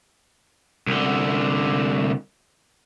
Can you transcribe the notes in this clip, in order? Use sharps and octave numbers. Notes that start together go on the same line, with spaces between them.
C2 D3